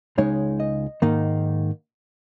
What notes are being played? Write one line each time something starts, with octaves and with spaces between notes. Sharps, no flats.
C#2 C#3 G#3 D#4 C#5
D#5
G#2 D#3 A#3 D#4